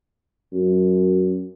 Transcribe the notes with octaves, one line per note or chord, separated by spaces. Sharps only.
F#2